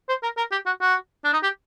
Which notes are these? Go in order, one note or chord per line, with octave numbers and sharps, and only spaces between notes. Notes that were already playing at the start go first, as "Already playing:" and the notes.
C5
A#4
A#4
G4
F#4
F#4
D4
D#4
G4